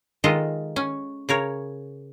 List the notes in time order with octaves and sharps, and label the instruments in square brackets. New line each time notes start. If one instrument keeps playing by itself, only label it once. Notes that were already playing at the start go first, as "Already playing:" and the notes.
[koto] D#3 G#3 F4 A4 D#5
C#4
C#3 A#4 C#5